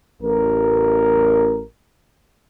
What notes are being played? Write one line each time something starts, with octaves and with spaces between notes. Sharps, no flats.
A1 A#4